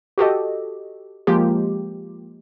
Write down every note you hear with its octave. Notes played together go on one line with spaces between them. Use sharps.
F#4 G4 A4 D#5
F3 G#3 A#3 F4 G4